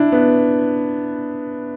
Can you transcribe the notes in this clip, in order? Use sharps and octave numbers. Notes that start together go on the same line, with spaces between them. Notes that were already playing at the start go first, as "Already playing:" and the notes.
Already playing: D4 E4
B3